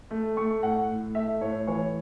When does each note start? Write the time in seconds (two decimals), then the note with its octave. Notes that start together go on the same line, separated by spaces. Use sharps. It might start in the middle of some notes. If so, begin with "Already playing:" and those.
0.11 A3
0.37 A3 C#6
0.63 A2 F#5
0.89 A2
1.15 A3 E5
1.41 A2 C#5
1.67 E3 C#5